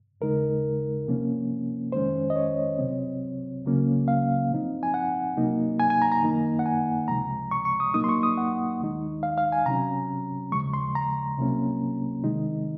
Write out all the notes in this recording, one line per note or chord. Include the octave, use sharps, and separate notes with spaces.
D#2 C#3 G#3 D#4 A#4
C3 F3 A#3 C#4
F2 D#3 G#3 C#4 C5
D#5
C#5
C2 C3 F#3 C4
C#2 C#3 F#3 A#3 C#4
F5
A#2 F3 C4 D#4
G#5
F#5
C2 C3 F#3 A#3 D#4
G#5
G#5
A#5
A#5
F#2 D#3 A#3 D#4
F#5
G#5
C#2 C3 F3 G#3 A#5
C#6
C#6
D#6
A#2 F#3 A#3 D#4 D#6
C6
C#6
D#6
F#5
D#2 D#3 G#3 D#4
F5
F5
G#5
C3 F#3 C#4 A#5
D#2 C#3 F3 G#3 C#6
C6
A#5
C2 C3 F#3 A#3 C#4
C3 D#3 G#3 D#4